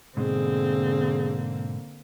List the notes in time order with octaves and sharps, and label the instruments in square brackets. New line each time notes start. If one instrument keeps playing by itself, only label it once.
[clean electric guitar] G#2 B2 [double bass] D3 A#3 [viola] C4 [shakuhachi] G#4